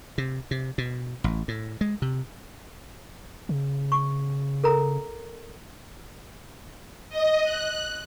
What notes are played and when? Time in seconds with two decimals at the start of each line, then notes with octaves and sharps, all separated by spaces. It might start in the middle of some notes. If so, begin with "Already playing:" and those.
0.18 C3
0.51 C3
0.78 B2
1.24 A1
1.48 A2
1.81 G#3
2.02 C3
3.49 C#3
3.92 C#6
4.64 A4 A#4 A#5
7.09 D#5
7.43 F#6